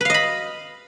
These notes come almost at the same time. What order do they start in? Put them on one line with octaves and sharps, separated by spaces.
B4 F5 D#5 B5